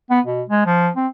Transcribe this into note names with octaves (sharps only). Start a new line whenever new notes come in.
B3
B2
G#3
F3
C4